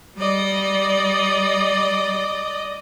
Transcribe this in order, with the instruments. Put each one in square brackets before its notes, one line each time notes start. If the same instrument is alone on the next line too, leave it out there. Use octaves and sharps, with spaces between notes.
[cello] G3 [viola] D5 D#5